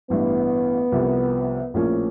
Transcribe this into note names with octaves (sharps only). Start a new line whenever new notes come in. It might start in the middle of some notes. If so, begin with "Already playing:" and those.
A1 G2 E3 B3
C2 C3 F3
A#1 A2 F3 A#3 C#4